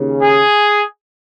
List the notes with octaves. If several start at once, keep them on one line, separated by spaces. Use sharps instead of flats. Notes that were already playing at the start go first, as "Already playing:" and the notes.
Already playing: D#2 C#3
G#4